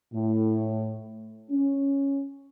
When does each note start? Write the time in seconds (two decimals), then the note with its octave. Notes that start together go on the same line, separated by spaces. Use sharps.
0.14 A2
1.51 C#4